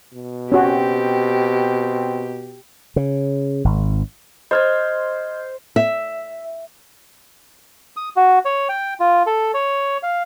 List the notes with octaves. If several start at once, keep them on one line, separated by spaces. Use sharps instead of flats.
B2
C4 C#4 F#4 G4
C#3
G#1
C5 D#5 F6 G#6
E5
D#6
F#4
C#5
G5
F4
A4
C#5
F5